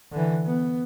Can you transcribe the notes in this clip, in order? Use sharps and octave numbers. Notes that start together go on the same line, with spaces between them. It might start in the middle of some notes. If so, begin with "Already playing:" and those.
D3 E3
B3